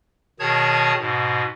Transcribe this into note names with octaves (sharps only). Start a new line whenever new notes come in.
B2 D#3 G#4 C#5 A5 G#6
G#2 B2